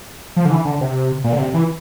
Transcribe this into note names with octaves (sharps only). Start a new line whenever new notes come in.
F3
D3
E3
D3
C3
A#2
D3
C3
E3